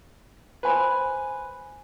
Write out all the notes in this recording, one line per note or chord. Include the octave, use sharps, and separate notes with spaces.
B4 C5 G#5 B5